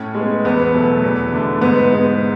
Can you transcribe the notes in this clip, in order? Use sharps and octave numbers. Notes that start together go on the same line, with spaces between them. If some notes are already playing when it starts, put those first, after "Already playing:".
Already playing: A2 C#4
G#3
B3
E2 B3
B2 F#3 A3
E2
D3 A3
G#2 B3
G#3 B3